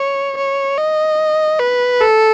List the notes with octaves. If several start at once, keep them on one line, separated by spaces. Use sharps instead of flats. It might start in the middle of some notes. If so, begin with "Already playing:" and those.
Already playing: C#5
C#5
D#5
B4
A4